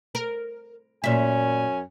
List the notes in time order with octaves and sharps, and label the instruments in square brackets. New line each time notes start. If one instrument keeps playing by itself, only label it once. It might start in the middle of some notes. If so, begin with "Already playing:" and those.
[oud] A#4
[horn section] F#2 C#4 G#5 [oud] A#2 E5